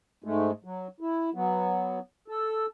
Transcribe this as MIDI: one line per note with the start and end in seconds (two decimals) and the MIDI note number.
0.24 0.51 44
0.24 0.51 56
0.24 0.51 57
0.64 0.87 54
1.01 1.30 64
1.35 1.99 54
1.35 1.99 59
2.28 2.66 69